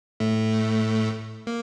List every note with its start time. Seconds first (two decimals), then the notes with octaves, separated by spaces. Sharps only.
0.20 A2 A3
1.47 A#3